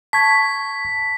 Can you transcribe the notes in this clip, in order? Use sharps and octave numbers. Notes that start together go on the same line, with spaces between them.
A5 C#6 G#6 B6